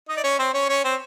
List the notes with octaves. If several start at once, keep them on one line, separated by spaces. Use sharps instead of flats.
D#4 D#5
D5
C#4 C#5
C4 C5
C#4 C#5
C#4 C#5
C4 C5